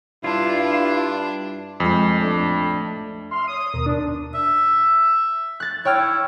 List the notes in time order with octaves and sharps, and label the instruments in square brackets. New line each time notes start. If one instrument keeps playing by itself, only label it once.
[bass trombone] G2 [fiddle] D4 [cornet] E4 [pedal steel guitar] F4
[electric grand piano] F2 [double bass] G#3
[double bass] A3 D4
[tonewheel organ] E5 F6 [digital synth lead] C6
[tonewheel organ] C#5 [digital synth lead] D#6
[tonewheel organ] D#2 B2 A#4
[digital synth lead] D4
[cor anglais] E5
[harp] F#6 A6
[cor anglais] E4 [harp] C#5 G5 F6